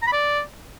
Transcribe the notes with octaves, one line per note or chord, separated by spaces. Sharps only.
A#5
B5
D5